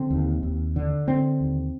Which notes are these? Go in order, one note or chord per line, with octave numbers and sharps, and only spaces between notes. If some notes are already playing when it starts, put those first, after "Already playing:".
Already playing: D3 C4
D#2
D#2
D3
D3 C4
D#2